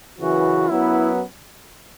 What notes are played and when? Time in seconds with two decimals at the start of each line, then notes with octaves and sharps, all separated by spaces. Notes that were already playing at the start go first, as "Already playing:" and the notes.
0.18 F#2 C#3 E3 F#4
0.70 F#2 F#3 B3 E4